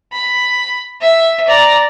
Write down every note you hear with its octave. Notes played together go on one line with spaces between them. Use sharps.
B5
E5
D5 A#5